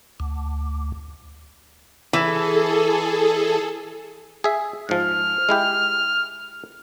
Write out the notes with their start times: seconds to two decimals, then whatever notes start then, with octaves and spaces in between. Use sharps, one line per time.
0.20 D2
2.13 E3 G#4 A4
4.44 G#4 E5
4.89 G#2 F3 F6
5.49 G#3 E4 G4